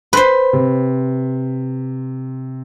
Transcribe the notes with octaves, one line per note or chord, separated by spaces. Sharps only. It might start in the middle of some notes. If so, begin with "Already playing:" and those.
B4 C5 C6 B6
C3